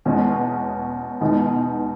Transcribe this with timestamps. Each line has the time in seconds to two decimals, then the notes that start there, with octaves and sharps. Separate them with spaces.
0.05 E2 B2 G#3 C#4
1.21 E2 B2 G#3 B3 D#4